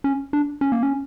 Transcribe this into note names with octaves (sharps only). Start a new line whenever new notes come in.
C#4
D4
C#4
A#3
C#4